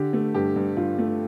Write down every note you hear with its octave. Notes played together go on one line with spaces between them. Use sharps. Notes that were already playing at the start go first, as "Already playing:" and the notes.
Already playing: D3 G4
A3
G2 G4
G2
G2 F4
A3